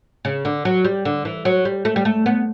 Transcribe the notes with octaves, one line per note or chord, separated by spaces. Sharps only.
C#3
D3
F#3
G3
D3
E3
F#3
G3
A3
G3
A3
B3